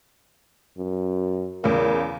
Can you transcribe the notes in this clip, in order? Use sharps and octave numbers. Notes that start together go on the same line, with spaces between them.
F#2
E2 C#3 A#4